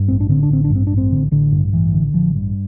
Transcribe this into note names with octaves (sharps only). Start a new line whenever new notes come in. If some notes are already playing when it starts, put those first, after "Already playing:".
Already playing: G2
A1 C4
D4
D3 C4
D4
A1 C4
D4
G2
C4
A1 D4
C4
D3
A1 D3
G2
A1 E3
D3
A1 F3
G2